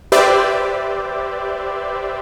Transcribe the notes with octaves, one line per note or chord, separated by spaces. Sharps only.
G4 B4 C5 D5 E5